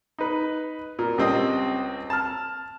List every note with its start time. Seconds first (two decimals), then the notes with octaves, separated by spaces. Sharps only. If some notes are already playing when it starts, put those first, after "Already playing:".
0.19 D#4 B4
0.99 A#2
1.18 C#2 G3 C4 D#5 D#6
2.10 A5 F6